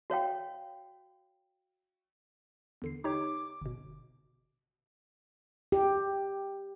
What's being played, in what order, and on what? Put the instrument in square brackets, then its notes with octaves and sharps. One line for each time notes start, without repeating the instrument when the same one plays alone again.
[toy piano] F#4 C#5 F5 G5
[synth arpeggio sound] E2 D3 C7
[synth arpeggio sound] D#4 G4 C#5 [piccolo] D6
[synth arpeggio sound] G1 B2
[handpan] G4